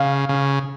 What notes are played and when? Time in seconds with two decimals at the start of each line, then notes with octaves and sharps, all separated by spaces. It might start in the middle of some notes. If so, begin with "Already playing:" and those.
Already playing: C#3 F5
0.29 C#3